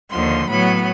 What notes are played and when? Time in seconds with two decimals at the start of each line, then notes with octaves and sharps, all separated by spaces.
0.10 D#2 D3 F3 C6
0.48 A2 F#3 B3 B5